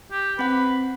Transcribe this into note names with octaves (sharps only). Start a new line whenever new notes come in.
G4
C4 B4 F#5